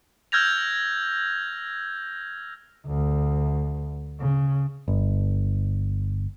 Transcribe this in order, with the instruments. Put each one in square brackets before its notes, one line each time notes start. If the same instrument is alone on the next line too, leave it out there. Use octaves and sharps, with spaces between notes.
[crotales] E6 F6 G6 G#6 A#6 F7
[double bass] D2
C#3
[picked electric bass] G1